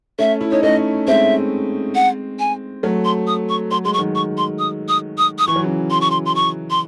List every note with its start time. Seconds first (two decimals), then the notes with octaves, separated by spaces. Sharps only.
0.19 A3 C#4 E5
0.41 E4
0.51 D#4 C#5
0.63 A3 C#4 D#5
1.07 G#3 C4 E5
1.95 F#5
2.39 G#5
2.83 F#3 A3
3.05 C6
3.27 D#6
3.49 C#6
3.71 F#3 C6
3.85 G#3 C6
3.93 C#6
3.98 D#3 F#3
4.15 C#6
4.38 C6
4.59 D#6
4.89 D#6
5.18 D#6
5.39 D#6
5.47 E3 C#6
5.56 F#3
5.64 C#3 E3
5.91 C6
6.01 C#6
6.11 C6
6.26 C6
6.35 C#6
6.71 C6